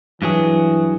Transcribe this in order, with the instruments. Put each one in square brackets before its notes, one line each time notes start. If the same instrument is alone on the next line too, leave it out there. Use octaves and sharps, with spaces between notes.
[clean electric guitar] G2 F#3 G#4 [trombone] E3